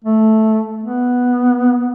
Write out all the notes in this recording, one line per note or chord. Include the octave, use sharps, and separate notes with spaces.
A3
B3